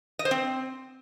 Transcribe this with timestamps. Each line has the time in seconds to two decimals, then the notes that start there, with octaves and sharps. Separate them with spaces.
0.19 D#5
0.25 C5
0.31 C4